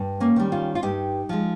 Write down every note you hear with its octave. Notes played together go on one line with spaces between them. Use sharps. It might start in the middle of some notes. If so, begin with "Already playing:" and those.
Already playing: G2
A#3 C#4
D#3 G3
C#4 F4
F4
G2 D#4 G4
F3 G#3